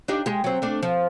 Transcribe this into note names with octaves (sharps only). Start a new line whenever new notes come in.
D4 D#4 G4
G#3 G4
F#3 C4
A3 D4
F3